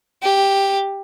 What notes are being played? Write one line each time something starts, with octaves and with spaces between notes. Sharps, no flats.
G4